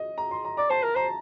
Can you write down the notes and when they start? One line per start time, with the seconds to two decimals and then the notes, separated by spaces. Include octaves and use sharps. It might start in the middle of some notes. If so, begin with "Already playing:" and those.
Already playing: D#5
0.18 A#5
0.31 C6
0.45 A#5
0.57 D5 A#5
0.70 C5 A5
0.83 A#4
0.95 C5 A#5